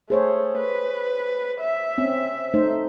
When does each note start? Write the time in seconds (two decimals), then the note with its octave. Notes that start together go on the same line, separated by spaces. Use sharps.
0.10 A3 G#4 C5 C#5
0.57 B4
1.60 E5
1.98 C4 C#4
2.54 A3 D#4 C5